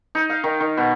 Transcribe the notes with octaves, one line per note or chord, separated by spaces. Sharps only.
D#4
F5
D#3
D#3
B2